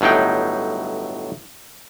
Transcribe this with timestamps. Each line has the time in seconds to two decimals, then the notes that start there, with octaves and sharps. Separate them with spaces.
0.01 G1 A2 F#3 D#4 G5